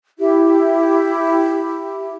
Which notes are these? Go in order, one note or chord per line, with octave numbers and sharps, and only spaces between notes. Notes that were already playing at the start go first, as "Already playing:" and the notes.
E4 G4